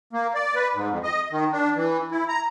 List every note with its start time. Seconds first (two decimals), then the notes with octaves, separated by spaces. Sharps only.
0.13 A#3
0.35 D5
0.55 B4
0.75 G#2
0.90 F2
1.03 D#5
1.31 D#3
1.52 D4
1.76 E3
2.11 E4
2.28 A#5